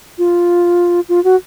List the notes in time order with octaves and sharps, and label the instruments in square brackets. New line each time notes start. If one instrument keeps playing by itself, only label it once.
[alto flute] F4
F4
F#4